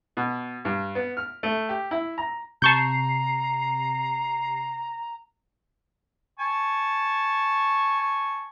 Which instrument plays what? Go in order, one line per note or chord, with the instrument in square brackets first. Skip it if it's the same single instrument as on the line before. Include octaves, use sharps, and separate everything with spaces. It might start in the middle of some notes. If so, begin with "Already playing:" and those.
[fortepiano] B2
G2
B3
F6
A3
G4
E4
A#5
[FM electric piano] C3 C7 [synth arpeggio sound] A5 C#6 G6 [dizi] A#5
[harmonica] G#5 A5 C#6